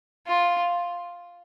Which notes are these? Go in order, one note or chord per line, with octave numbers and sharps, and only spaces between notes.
F4